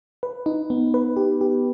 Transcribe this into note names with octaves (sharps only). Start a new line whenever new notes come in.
B4
D#4
B3
B4
G4
G4